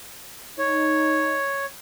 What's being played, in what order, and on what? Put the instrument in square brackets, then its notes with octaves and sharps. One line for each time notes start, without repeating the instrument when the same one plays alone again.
[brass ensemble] D#4 [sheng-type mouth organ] C#5